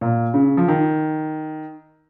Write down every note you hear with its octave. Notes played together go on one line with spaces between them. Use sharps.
A#2
C#3
F3
D#3